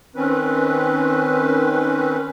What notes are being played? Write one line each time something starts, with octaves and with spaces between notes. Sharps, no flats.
D#3 C4 C#4 B4